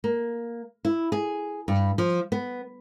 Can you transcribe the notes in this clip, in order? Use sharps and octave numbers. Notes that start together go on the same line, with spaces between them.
A#3
E4
G#4
G2
F3
B3